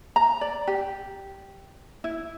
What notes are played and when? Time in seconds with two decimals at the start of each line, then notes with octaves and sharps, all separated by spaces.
0.16 A#5
0.41 D5
0.67 G4
2.04 E4